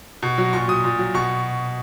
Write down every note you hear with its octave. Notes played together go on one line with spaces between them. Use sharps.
B2
F#3
A#2 C#6
F#3 D#6
A#2
F#3
B2 C#6